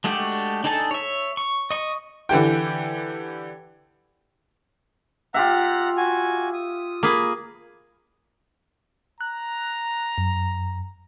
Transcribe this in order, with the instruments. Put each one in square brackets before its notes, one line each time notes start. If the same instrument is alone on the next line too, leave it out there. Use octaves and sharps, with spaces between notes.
[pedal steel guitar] G#3 A3 D4 F#4 G4
D4 D#4 G#4 A4 A5
C#5 E5
C#6
D#5 C#6
[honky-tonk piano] D3 E3 G4 G5
[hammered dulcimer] F4 G4 E5 [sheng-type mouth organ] F#5 A#5
[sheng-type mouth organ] F#4 G#5
D#6
[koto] A#3 G#4 [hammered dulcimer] A#5 B5
[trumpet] A#5 [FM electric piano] F#6
[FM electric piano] F#2